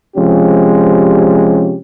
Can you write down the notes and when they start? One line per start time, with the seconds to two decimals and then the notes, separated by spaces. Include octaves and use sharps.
0.15 C3 F3 G#3 C#4 G4